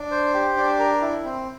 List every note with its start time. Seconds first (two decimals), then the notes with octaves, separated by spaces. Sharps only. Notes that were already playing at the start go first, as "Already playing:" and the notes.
Already playing: D4
0.11 C5
0.34 G4
0.57 D4
0.79 A#4
1.01 E4
1.24 C4